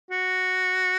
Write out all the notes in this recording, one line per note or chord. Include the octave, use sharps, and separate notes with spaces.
F#4